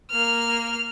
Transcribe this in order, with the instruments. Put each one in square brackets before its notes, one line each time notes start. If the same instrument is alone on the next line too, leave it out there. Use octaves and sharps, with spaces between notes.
[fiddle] A#3 F6